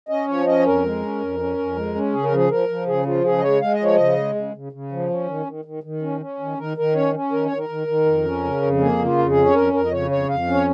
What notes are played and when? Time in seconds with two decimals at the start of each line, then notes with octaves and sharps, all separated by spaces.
0.09 C#4 D#5
0.28 F3 C#5
0.46 C#4 D#5
0.60 C#5
0.64 F2 A#4
0.84 G#3
1.02 C#4
1.21 F2
1.39 C#4
1.58 F2
1.76 G#3
1.95 C#4
2.13 C#3 G#4
2.24 A#4
2.32 F3 G#4
2.51 F3 A#4
2.69 F3
2.87 C#3 G#4
3.06 F3 F4
3.24 C#3 G#4
3.38 D#5
3.42 G#3 C#5
3.61 G#3 F5
3.73 D#5
3.79 F3 C#5
3.95 C#3 D#5
4.17 G#3
4.35 C#3
4.54 C#3
4.72 C#3
4.92 F3
5.10 C#4
5.28 D#3
5.46 D#3
5.65 D#3
5.83 D#3
6.02 C#4
6.20 C#4
6.40 D#3
6.58 D#3 A#4
6.77 D#3 A#4
6.95 C#4 C#5
7.14 C#4
7.32 D#3 A#4
7.46 C#5
7.51 D#3
7.58 A#4
7.69 D#3
7.87 D#3
8.06 F2
8.25 C#4
8.44 C#3
8.62 F2
8.81 A#3 G#4
8.99 C#3
9.05 F4
9.18 F2
9.30 G#4
9.37 C#4
9.46 C#5
9.54 F2 A#4
9.73 F2 A#4
9.85 D#5
9.91 C#3 C#5
10.10 F2 C#5
10.28 F2 F5
10.47 C#4
10.54 C#5